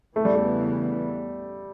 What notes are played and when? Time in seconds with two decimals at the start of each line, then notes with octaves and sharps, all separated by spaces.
0.16 E2 C#3 E3 A3 B3
0.25 G3
0.35 A3